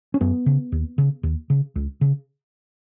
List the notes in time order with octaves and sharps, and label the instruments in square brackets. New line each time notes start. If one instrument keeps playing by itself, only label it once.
[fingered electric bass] C#4
F#2 B3
C#3
D#2
C#3
D#2
C#3
C#2
C#3